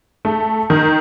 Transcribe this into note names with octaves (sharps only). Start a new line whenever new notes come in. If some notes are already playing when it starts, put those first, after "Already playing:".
A3
D#3